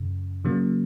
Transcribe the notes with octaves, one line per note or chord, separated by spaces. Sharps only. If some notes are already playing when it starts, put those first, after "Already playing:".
Already playing: F#2 C#3
C#3 F#3 A#3